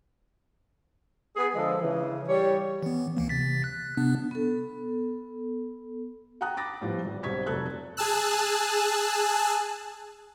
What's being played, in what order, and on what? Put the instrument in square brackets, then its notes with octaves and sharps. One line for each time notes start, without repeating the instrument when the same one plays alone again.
[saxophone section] B3 G#4
D3 F3 G#3 A4
C#3 E3
G3 C#5
[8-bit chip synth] E3 B3
C#2 E3 A#3
C3 A6 B6
F#6
C3 B3 D4
[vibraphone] B3 A4
[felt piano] F#5 G5 A5 A#5 D#6 F#6
B5 D6 A6 A#6
A2 F3 G3 B3
G#1
B1 G2 C4 C#6 G#6 B6
F1 F#3 A4 F#6 G#6
[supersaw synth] G#4 G#5 A5 E6 F#6